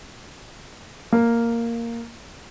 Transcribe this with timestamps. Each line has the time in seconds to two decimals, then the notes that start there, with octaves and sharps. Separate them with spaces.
1.12 A#3